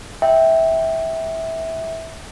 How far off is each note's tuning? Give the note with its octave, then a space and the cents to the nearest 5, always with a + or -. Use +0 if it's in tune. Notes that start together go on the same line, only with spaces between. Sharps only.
E5 -15 G5 +0